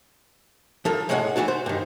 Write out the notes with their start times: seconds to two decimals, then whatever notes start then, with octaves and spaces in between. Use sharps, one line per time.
0.85 F3 F#3 A4 A#4
1.09 A2 G#3 G#4 C#5 F#5
1.36 E3 A3 F#4 A4
1.48 C5
1.66 G2 D#3